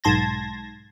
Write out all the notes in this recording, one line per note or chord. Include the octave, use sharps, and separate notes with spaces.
B1 G#2 A5 C6 G#6 A#6